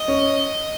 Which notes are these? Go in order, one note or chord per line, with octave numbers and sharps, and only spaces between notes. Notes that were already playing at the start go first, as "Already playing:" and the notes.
Already playing: D#5
C#4